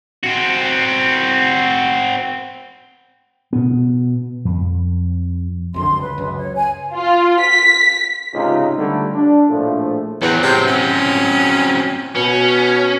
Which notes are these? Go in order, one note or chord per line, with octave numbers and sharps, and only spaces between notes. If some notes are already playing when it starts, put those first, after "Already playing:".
C4 F#4
B2 B3
F2
C2 F#2 D3 C6
C#2
B4
C#2 F#2
C#5
G#5
F4
B6
C#2 G#2 C3 D#4 F4
D3 G3 A3
D4
A#1 A2 F3 A3
E2 F#3 C4
C3
C#4
B2 C#4